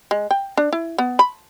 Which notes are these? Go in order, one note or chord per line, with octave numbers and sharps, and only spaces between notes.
G#3
G5
D4
E4
B3
B5